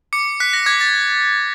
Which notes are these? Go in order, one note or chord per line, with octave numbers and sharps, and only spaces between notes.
D6 C#7
F#6 B6
A#6
D6 G#6
A6